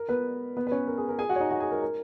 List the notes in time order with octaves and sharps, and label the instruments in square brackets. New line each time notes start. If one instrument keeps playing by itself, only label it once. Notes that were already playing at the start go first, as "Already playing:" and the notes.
Already playing: [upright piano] A#4
B3 B4
B3 B4
B4
C#4 C#5
A#4
G#4
A#4
G#4 G#5
F#4 F#5
C#5
D#4 D#5
F#4 F#5
G#4 G#5
A#4
A#4